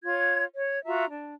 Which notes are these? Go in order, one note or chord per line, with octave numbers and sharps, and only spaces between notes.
F4 C#5 G#6
C#5
F4 F#4 E5 A#5
D4